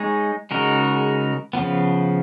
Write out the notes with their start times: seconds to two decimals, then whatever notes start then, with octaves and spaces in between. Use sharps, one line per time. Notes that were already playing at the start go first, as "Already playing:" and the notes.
Already playing: G#3 D#4 G#4 C#5
0.51 C#3 G#3 D#4 F#4 A#4
1.53 C#3 F3 B3